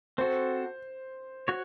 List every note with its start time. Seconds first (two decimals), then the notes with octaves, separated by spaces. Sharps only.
0.18 C4 F#4 A4 C5
1.48 F#4 C#5